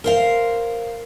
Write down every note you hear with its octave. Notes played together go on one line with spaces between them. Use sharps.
A#4 C5 F5